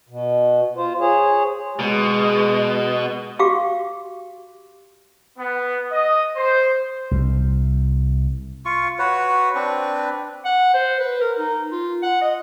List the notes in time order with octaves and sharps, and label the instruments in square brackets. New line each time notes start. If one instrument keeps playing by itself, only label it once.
[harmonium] B2
F4 C5
G#4 C5 C#5
[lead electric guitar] B2 [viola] G#3
[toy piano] F#4 G4 F5 D6
[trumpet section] B3
D#5
C5
[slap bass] C2
[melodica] F4 C#6
F#4 B4 C#5
C4 D4 B4
[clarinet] F#5
C5
B4
A#4
D#4
F4
F#5
D#5